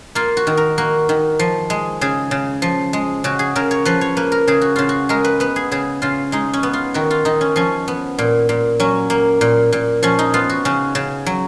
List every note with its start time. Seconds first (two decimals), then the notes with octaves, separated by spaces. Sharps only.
0.15 A#3 F4
0.37 F#4
0.47 D#3
0.57 A#4
0.78 A#3 F#4
1.09 D#3
1.39 F3
1.70 G#3
2.01 C#3 G#4
2.31 C#3
2.62 F3
2.93 G#3
3.24 C#3 F#4
3.39 G#4
3.56 C#3 A#4
3.71 C#5
3.85 F3 B4
4.01 C#5
4.17 A#3 B4
4.32 A#4
4.47 C#3 G#4
4.61 F#4
4.76 C#3 F4
4.89 F#4
5.09 G#3 A#4
5.24 B4
5.40 B3 B4
5.56 G#4
5.72 C#3 G#4
6.02 C#3 F4
6.32 G#3 D#4
6.53 C#4
6.63 B3
6.73 F4
6.94 D#3 F#4
7.11 F4
7.25 D#3 D#4
7.41 C#4
7.56 F3 C#4
7.88 B3
8.19 A#2
8.49 A#2
8.80 F#3 C#4
9.10 A#3
9.41 A#2
9.72 A#2
10.03 F3 C#4
10.19 D#4
10.34 B3 F4
10.49 F#4
10.65 C#3 C#4
10.95 C#3
11.26 F#3